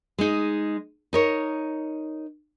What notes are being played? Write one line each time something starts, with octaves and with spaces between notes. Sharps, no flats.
G#3 D#4
D#4 A#4 C#5